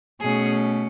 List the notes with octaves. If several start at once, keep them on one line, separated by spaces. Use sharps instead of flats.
B2 A3 C#4 G#4